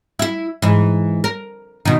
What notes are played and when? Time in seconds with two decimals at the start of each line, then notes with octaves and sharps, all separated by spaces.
0.19 E4 E5
0.62 G#2 E3
1.24 A#4
1.85 B2 D#3